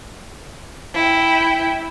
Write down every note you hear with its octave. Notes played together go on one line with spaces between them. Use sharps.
E4 G5